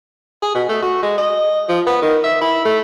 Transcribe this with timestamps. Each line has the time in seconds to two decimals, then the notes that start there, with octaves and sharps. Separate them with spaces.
0.42 G#4
0.55 B2
0.69 A3
0.82 F#4
1.03 G#3
1.18 D#5
1.68 F3
1.87 B3
2.02 D#3
2.24 E5
2.41 E4
2.65 A3